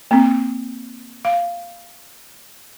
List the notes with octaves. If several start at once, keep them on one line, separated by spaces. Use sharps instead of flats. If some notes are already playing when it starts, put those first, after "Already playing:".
A#3 C4
F5